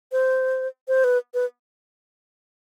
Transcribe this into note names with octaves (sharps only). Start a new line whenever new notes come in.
C5
C5
B4
B4